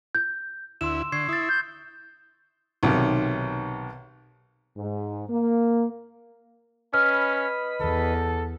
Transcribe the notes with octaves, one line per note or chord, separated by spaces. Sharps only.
G6
D2 E4 C6 E6 E7
D3 C#6 G#6 C7
E4 D#6 A6
G6
B1 C3 D#3
G#2
A#3
C#4 B4 D#5 B5 F6
E2 A4